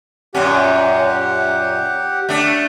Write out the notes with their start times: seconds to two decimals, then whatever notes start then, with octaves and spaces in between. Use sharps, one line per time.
0.35 F#2 A#2 C#4 G4 F#5
2.29 A3 D4